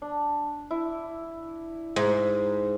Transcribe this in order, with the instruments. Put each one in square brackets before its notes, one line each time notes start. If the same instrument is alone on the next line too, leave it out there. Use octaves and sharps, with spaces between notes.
[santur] D4
E4
[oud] G#2 [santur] E5